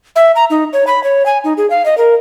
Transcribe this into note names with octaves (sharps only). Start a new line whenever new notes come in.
E5
A#5
D#4
C#5
B5
C#5
G#5
D#4
G#4
F5
D#5
A#4